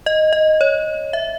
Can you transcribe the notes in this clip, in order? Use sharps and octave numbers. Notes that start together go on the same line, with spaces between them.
D#5
D#5
C#5
E5